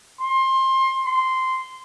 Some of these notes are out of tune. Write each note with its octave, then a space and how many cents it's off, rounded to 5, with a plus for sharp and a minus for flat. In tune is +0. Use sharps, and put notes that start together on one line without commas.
C6 +25
C6 -10